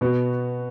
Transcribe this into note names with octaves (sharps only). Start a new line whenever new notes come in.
B2 B3 F#4